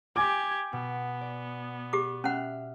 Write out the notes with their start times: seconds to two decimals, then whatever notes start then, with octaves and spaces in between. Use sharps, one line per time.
0.16 G4 G#5 D6 G#6 A#6
0.73 B2 B3
1.21 D5
1.93 G4 D6
2.24 C#4 E5 F#5 F6 F#6